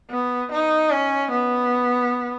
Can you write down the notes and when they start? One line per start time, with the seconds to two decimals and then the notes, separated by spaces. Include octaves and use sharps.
0.10 B3
0.51 D#4
0.91 C#4
1.31 B3